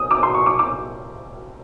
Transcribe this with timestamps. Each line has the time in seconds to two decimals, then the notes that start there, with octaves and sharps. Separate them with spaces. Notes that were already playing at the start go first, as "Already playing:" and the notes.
Already playing: D#6
0.11 D6
0.23 C6
0.34 C#6
0.46 D6
0.59 D6